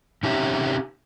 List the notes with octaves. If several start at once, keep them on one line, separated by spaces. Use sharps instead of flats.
C3 C#4 D#4 G4 E5